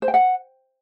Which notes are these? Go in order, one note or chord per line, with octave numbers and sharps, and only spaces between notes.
C5
G5
F#5